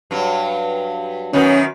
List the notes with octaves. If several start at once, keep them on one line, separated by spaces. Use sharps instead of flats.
G2 F#3
F#2 D#3 B3 C#4